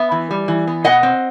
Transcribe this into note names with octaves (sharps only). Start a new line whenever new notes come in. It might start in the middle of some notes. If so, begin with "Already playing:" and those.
Already playing: B3 E5
E3
G3
E3
B3
B2 D#5 F#5
C4